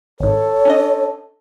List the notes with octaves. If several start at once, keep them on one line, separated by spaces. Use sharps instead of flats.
G#1 G#2 A4 C#5
C#4 D4 D#5